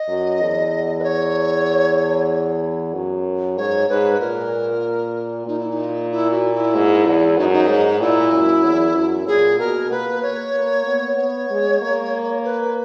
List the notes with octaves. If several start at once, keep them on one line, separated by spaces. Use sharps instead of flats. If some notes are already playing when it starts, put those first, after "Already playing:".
Already playing: D#5
F#2
E2
B4
C#5
F#2
G#2 C#5
G#2 B4
A#2 A#4
A#2 D#4
E4
D#4
E4
F#4
E4
G#2
E2
F#2 D#4
D#4
G#2
A#2 E4
F#2
E2
F#2
A#2 G#4
B2 A#4
A#3 B4
C#5
A#3
B3
B3 C#5
G#3
A#3
B4